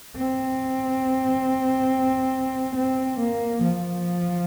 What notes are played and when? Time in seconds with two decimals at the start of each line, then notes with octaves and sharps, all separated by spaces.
0.17 C4
2.76 C4
3.20 A#3
3.63 F3